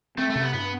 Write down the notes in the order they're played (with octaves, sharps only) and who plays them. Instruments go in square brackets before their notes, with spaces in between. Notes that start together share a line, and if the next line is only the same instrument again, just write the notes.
[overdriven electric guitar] A3 [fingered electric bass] C4
[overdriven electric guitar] A3
[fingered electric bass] C3
[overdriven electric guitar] B3
[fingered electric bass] G2 [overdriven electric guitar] B3